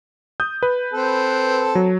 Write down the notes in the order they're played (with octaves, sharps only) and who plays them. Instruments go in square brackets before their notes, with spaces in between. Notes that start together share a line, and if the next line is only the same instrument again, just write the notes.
[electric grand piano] D#6 G6
B4
[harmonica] C4 A4
[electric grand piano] F#3